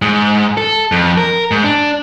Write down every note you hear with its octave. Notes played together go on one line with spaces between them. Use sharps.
G#2
A4
F2
A#4
G#2
D4